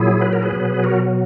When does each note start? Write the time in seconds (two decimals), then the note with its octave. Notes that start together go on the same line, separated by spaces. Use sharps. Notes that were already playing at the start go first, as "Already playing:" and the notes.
Already playing: A#2 F#3 E4 G#4
0.21 B4
0.33 A#4
0.43 G#4 B4
0.52 B2 F#3
0.83 F#4 A#4